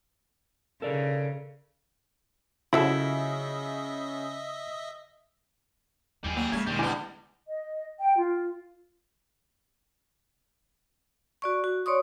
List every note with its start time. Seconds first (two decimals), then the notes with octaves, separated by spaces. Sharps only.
0.82 C#3 A4 A#4 D5
2.73 C#3 F3 F#3 E4 A4 D#5 E5
6.25 D#2 G3 E4 G#4
6.37 F#3 A#3
6.52 C#3 G#3 A3 G#6
6.67 E1 D#3 G3 G#3
6.79 D3 B3 E4 G#5 D6
7.47 D#5
8.00 G5
8.16 F4
11.42 F#4 D5 C#6
11.64 F#4
11.86 C#5 D5 C6 C#6 D#6